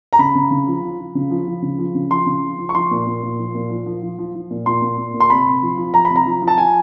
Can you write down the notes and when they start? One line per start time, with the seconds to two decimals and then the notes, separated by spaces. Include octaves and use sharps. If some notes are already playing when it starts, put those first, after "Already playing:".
0.13 A#5
0.19 C#3 B5
0.35 C#3
0.51 C#3
0.67 F3
0.83 F3
0.99 F3
1.15 C#3
1.30 F3
1.48 F3
1.62 C#3
1.78 F3
1.95 C#3
2.11 F3 C6
2.26 C#3
2.42 F3
2.59 F3
2.69 C#6
2.75 F3 C6
2.91 A#2
3.07 A#2
3.23 A#2
3.38 F3
3.55 A#2
3.70 F3
3.86 F3
4.02 F3
4.18 F3
4.35 F3
4.50 A#2
4.66 A#2 C6
4.82 A#2
4.98 A#2
5.14 A#2
5.20 C6
5.30 C3 B5
5.46 C3
5.62 F3
5.77 F3
5.94 F3 A#5
6.05 B5
6.10 C3
6.16 A#5
6.26 F3
6.42 F3
6.48 A5
6.58 F3 G#5